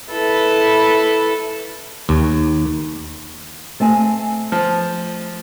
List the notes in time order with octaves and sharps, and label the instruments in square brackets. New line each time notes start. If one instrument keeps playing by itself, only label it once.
[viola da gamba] E4 A4 B4
[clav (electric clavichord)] D#2
[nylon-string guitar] A3 C4 G#5
[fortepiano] F3